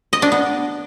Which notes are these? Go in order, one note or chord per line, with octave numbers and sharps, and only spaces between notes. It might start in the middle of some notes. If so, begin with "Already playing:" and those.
D#5
D4
B3